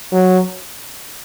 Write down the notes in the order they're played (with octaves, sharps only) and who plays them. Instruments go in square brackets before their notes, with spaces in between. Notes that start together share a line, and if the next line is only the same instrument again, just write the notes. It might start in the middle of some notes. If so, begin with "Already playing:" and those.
[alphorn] F#3